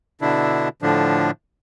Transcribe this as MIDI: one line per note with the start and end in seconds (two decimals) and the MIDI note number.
0.21 0.69 47
0.21 0.69 50
0.21 0.69 62
0.21 0.69 64
0.82 1.31 45
0.82 1.31 50
0.82 1.31 53
0.82 1.31 62